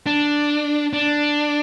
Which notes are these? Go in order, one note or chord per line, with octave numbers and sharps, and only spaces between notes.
D4
D4